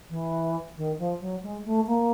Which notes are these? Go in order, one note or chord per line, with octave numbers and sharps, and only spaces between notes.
E3
D#3
F3
F#3
G#3
A3
A#3